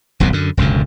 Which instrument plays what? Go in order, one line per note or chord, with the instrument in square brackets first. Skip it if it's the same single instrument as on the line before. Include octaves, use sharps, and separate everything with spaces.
[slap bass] D#1 B1 F#2 C3
F#2 D3
E1 C#2 F#2 D3